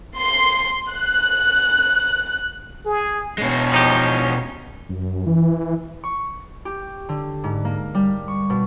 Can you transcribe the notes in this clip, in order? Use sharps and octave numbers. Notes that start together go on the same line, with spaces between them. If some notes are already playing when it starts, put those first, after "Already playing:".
C6
F#6
G#4
B2 G#3 C#4
F3 D#4 G4
F#2
E3
C#6
G4
D3
G#2
A#3
G3
C#6
B2